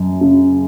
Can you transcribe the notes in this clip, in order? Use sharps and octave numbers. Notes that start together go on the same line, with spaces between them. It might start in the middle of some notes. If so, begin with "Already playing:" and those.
Already playing: F#2
C#3